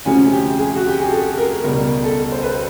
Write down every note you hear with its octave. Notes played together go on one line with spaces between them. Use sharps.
D2 C3 F3 G#3 C#4
G4
G#4
F#4
G4
G#4
A4
A#4
C#2 B2 G3 A#4
A4
C5
B4